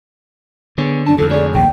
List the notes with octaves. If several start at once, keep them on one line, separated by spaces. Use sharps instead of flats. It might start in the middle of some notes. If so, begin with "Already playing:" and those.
D3 B3 G#4 C#5
F#2 D4 A5
F2 D3 F3 A4
A3 G#4 C#5 D5
A#1 D#2 C3 G5